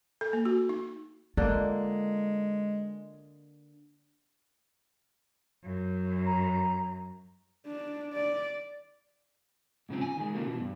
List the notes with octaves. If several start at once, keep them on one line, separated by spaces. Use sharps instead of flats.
A4
A#3
F#4
D#4
D3 G#3 A#3 F4
F#2
A#5
D4
D5
G#2 C#3 F3 C4
G#5
D#3 G#3
C#3 F3 G#3 A#3
B2 E3
G2